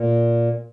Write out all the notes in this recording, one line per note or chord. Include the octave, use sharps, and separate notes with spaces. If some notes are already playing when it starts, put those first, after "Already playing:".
Already playing: A#2